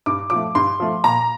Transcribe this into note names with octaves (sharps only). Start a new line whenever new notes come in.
G2 D6
F3 D6
A3
G2 C6
F3 A3
A#2 A#5